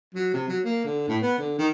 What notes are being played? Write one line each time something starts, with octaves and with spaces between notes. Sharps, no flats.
F#3
C3
F#3
A#3
D3
A2
B3
D3
D#3